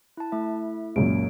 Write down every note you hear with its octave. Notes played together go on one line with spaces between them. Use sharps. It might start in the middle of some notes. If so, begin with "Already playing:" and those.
E4 A5
A3 E4 E5
C#2 F#2 A#2 C#5 D7